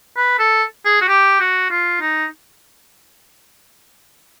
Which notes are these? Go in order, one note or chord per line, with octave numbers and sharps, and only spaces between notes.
B4
A4
G#4
F#4
G4
F#4
F4
D#4